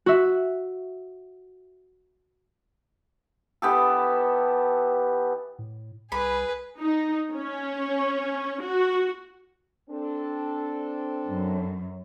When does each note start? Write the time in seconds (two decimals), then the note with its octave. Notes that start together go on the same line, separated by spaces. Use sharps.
0.06 F#4 E5
3.62 E3 B3 G4 A4
5.59 A2
6.12 C2 G#4 B4 B5
6.80 D#4
7.35 C#4
8.62 F#4
9.90 C4 D4 A4
11.26 F#2